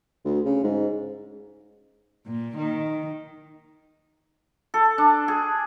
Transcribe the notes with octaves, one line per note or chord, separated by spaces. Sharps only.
D2
C#3
G#2
A#2
D#3
A4
D4
G#4